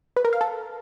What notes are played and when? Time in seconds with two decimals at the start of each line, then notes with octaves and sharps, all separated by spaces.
0.16 B4
0.25 A#4
0.33 F5
0.41 A4